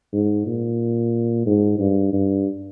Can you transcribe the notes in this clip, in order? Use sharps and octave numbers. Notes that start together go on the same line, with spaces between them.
G#2
A#2
G#2
G2
G2